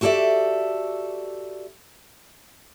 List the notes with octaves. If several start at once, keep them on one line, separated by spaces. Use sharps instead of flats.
F#4 G4 A4 C5 D5 E5